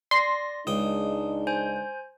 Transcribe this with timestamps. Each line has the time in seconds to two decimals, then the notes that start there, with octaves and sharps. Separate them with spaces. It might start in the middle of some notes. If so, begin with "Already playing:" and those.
0.11 D5 C6 A#6
0.67 C#2 G#3 D4 D#4 G5 D#6
1.47 C5 G#5 G6